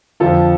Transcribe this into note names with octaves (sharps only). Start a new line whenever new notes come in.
F2 D3 F3 F4 A4